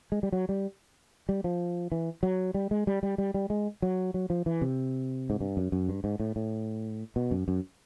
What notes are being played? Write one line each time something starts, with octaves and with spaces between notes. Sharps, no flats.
G#3
G3
F#3
G3
G3
F3
E3
F#3
G3
G#3
G3
G3
G3
G3
G#3
F#3
F#3
F3
E3
C3
G#2
G2
F#2
F#2
G2
G#2
A2
A2
B2
F#2
F#2